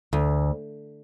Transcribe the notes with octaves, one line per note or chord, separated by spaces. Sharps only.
D2